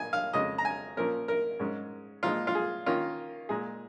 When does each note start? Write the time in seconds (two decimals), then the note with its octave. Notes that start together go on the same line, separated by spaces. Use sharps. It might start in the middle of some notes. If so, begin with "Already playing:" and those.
Already playing: A#2 A#3 G#5
0.13 F5
0.33 F2 C#3 G#3 D#5
0.58 A#5
0.65 G#5
0.97 A#2 F3 C#4 A#4
1.28 A#4
1.59 G#2 G#3 C#4
2.23 A#2 F3 G#3 D#4 F4
2.47 F4
2.55 G#4
2.86 D#3 A#3 C#4 F4
3.49 A#2 G#3 D#4 G#4